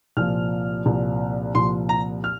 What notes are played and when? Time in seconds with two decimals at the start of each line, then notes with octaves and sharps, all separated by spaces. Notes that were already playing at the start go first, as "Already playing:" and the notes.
0.17 C2 A#2 F3 F6
0.85 C2 A#2 F3
1.55 C2 A#2 F3 C6
1.89 A#5
2.24 F6